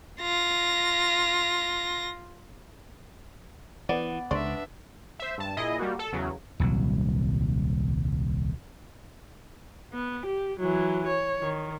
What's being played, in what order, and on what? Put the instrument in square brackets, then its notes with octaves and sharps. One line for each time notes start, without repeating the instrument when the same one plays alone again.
[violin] F4 A#6
[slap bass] E3 [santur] B3 [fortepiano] D5
[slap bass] C#2 [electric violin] D4 E5 [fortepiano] D5 C6 C#6
[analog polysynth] C5 E5
G2 A5
A#2 E4 G#4 D#5
G3 A#3 F#4
A4
E2 C#3 F#3
[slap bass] D#1 C2 F#3
[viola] B3
G4
E3 F#3
C#5
D#3